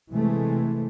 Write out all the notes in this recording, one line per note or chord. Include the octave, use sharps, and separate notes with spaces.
C3 E3 G#3 A3